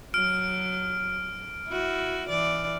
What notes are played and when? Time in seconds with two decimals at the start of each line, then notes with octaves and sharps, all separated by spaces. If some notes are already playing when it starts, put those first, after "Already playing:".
0.14 F#3 F6 D7
1.68 E4 F#4
2.29 E3 D5